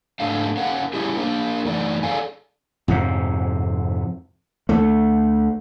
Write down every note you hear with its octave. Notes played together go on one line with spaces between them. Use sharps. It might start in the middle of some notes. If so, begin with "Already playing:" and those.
G#2 A3 D4 F5
C#4 A#4 F5 F#5
G3 C#4 E4 G4 G#4
A#3 D4 A#4
F#2 E3 A3 D#4 D5
G#4 A4 D5 F5 G#5
F2 G#2 C3
D2 A3